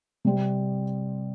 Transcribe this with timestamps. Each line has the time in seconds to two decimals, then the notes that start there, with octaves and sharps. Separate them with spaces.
0.25 C3 G3 C4 G4